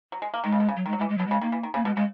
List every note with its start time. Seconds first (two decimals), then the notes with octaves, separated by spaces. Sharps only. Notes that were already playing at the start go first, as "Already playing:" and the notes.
0.12 F#3
0.22 G#3
0.34 A#3
0.44 D#3 G#3
0.52 C#3
0.60 B2
0.69 C#3
0.76 F#3
0.86 D#3 G#3
0.93 F#3
0.98 G#3
1.01 E3
1.09 G#3
1.18 B2 F#3
1.27 C#3 G#3
1.41 D#3 A#3
1.52 E3
1.63 D#3
1.74 C#3 A#3
1.85 B2 G#3
1.96 C#3 G#3